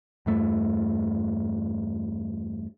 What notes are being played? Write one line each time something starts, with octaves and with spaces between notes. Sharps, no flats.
E2 G2 A3